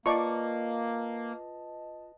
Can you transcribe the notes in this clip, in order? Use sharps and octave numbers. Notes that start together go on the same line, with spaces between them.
A#3 F4 B4 D5 D#5 A5 C#6